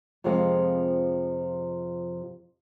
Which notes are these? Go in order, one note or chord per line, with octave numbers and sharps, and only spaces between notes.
F2 C3 F3 G#3 C4